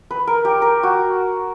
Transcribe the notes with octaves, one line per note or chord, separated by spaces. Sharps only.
B4
A#4
G4
A#4
F#4